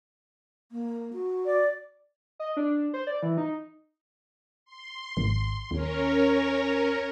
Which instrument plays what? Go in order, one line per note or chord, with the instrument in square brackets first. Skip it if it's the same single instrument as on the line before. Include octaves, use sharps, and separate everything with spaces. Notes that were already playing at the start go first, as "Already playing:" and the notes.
[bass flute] A#3
F#4
[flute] D5
[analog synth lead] D#5
D4
C5
D5
E3
D#4
[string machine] C6
[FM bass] G#1
[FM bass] D#2 [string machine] C#4 A#4 C#5